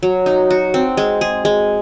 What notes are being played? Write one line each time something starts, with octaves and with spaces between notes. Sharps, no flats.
F#3
D#4
F#4
C4
G#3
G#4
G#3